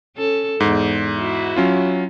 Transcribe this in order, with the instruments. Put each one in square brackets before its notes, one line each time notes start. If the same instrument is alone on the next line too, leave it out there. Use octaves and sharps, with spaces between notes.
[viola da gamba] C#4 A4
[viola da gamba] E2 [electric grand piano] G#2
[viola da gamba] E4 F#4
[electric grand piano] F#3 C#4 F4